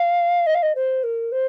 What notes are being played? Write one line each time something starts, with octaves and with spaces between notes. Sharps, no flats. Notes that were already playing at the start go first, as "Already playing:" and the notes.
Already playing: F5
D#5
F5
D#5
C5
A#4
C5